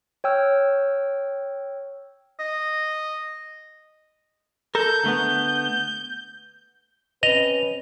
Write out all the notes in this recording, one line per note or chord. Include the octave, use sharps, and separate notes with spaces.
C#5 G5 E6 F6
D#5
A4 A#4 G6
D3 A3 B3
C4 C#4 B4 D#5 F7